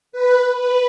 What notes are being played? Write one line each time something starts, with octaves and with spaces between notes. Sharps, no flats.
B4
B4